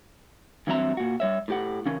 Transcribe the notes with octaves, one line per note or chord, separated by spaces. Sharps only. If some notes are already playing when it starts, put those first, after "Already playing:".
G2 E3 F#3 C4 E5 A#5
A#2 F#4
G3 C#5 E5
A2 G4 F#5
C#3 E3 C#4 A#4